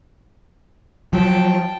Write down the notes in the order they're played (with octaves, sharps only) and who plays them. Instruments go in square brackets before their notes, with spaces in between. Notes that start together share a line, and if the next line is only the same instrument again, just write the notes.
[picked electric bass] F3 F#3 [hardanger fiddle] G5 A5